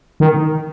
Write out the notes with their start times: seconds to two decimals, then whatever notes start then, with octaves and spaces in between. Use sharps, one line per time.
0.20 D#3